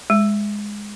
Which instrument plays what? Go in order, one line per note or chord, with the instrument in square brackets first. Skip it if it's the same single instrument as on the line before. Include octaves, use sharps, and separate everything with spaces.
[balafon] G#3